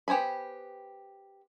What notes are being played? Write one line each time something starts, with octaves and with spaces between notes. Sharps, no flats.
B3 G4 C5 G#5 B5